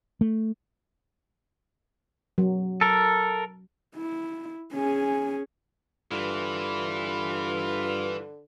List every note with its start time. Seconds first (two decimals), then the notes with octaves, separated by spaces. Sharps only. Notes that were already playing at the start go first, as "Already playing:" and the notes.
0.21 A3
2.38 F#3
2.81 A4 A#4
3.95 E4
4.74 C#4 G#4
6.11 G2 D3 E3 F4 B4